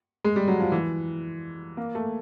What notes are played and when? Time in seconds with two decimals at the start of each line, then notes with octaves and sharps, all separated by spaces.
0.24 G#3
0.36 G3
0.48 F#3
0.60 F3
0.72 E3
1.77 A#3
1.95 A3